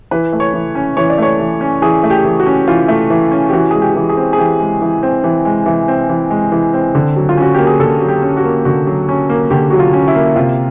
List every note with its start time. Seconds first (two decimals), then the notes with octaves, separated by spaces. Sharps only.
0.11 E3 B4
0.33 A3
0.40 C#5
0.54 E3
0.75 C#4
0.97 E3 C#5
1.09 D5
1.18 A3 C#5
1.39 E3
1.61 C#4
1.82 E3 G#4
2.03 A3
2.10 G4
2.24 E3
2.40 F#4
2.46 C#4
2.68 E3 F4
2.88 A3
3.10 E3
3.32 C#4
3.49 G4
3.53 E3 F#4
3.71 G#3 G#4
3.81 G4
3.96 E3
4.09 G#4
4.17 C4
4.33 G#4
4.38 E3 G4
4.60 G#3
4.81 E3
5.03 C4
5.24 E3
5.45 G#3
5.66 E3
5.88 C4
6.09 E3
6.30 G#3
6.52 E3
6.73 C4
6.95 D3
7.16 F#3
7.29 F4
7.37 C#4 F#4
7.54 A#3 G4
7.67 G#4
7.80 D3 A4
8.01 F#3
8.08 G4
8.22 C#4
8.37 F#4
8.44 A#3
8.65 D3 F#4
8.87 F#3
9.09 C#4
9.29 A#3
9.50 D3 G4
9.70 F#3 F#4
9.79 F4
9.93 C#4
10.08 E4
10.15 A#3
10.36 C3 F4